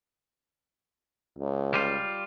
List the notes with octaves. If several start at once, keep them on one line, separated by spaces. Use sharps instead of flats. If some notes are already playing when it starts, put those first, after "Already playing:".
C#2
G3 F4